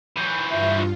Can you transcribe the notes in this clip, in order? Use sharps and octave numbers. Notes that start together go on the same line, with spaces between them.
E3 F#3 G6
G2 F4 E5 G6